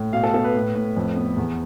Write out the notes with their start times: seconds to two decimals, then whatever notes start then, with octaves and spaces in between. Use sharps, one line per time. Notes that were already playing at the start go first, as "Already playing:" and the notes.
Already playing: A2
0.13 B2 F5
0.23 A4
0.34 B3 A4
0.44 B4
0.55 A2
0.75 A2
0.97 F2
1.16 B3
1.37 E2